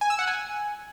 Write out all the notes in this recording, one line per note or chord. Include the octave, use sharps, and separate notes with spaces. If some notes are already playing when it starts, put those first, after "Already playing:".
G#5
E6
F#5
G#5